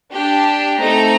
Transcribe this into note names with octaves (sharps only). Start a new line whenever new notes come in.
D4 G4
A3 C4 D#4 A#5